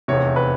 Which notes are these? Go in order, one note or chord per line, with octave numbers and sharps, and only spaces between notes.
F1 E2 C3 C#5
B4